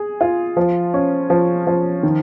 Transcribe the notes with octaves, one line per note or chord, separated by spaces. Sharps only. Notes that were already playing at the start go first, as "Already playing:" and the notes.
Already playing: G#4
F4
F3
C#4
F3
F3
D#3